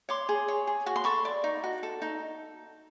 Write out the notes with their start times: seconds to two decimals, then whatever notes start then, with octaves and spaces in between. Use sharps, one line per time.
0.09 C#5 C6 D6
0.29 G#4
0.48 C#5
0.67 G#4
0.86 F#4 C#6
0.96 C6
1.04 A4 B5 C#6
1.25 D5
1.44 D#4
1.64 F#4
1.83 A4
2.02 D#4